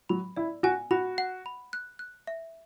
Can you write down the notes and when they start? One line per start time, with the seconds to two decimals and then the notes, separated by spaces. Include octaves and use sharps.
0.09 F#3 B5
0.36 E4 D5
0.63 F#4 G#5
0.91 F#4 B5
1.18 F#5
1.46 B5
1.73 F#6
1.99 F#6
2.27 E5